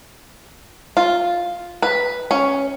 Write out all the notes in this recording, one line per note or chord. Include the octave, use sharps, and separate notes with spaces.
F4
B4
C#4